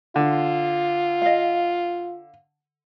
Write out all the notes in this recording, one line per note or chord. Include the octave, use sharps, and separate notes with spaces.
D3 F4
D#5 F5